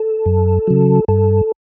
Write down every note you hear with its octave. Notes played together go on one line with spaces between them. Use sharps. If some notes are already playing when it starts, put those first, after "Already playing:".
Already playing: A4
F#2
C#3 F#3
G2 A4